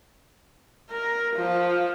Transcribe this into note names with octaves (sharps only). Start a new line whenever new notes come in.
A#4
F3